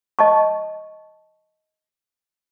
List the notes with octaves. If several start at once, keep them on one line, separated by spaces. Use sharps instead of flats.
D#5 A5 C#6